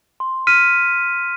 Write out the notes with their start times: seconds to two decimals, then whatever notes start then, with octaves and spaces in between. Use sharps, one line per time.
0.20 C6
0.47 F6 B6 D#7